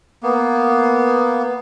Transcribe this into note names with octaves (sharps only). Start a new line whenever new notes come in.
A#3 B3